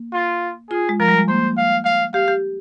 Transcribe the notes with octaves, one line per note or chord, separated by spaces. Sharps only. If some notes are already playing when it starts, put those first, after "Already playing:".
Already playing: A#3
F4
F4 G#4
G#3
F3 A#4
G3
G#3
A#3 C5
F5
F5
G4 F5
G4